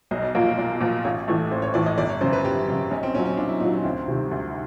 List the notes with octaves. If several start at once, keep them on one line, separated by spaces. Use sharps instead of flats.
B1 D#5
D5
A#2 F3 A#3 C#5
D5
B1 D5
A#2 F3 A#3
A1 C#5
A2 E3 A3
A1 C5
C#5
A2 E3 A3 D5
D#5
G1 D5
C#5
F#2 C#3 C5
B4
G1 G4
F#2 C#3
B1 C#4
C4
A#2 F#3 C#4
C#4
B1 D4
E4
A#2 F#3 D#4
C#4
D2 C4
C3 D#3 G3
D2